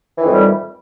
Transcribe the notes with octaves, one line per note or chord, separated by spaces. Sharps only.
F2 A2 D#3 E3 G3